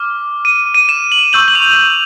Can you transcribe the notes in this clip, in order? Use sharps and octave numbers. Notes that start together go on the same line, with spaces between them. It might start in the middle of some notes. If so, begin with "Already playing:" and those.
Already playing: D6 F6
D#7
D#7
E7
F#7
C#6 E6 G6 F#7
F#7
F7